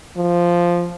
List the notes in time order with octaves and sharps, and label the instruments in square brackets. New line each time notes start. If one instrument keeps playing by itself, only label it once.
[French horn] F3